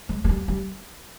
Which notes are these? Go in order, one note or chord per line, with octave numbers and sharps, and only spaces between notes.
G#3
G#3
G3
G3